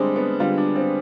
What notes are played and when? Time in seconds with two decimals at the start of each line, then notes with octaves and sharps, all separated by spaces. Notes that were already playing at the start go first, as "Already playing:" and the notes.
Already playing: D3 G3 G#3 C4 D4
0.16 B3
0.40 D3 G3 F4
0.58 D4
0.76 C4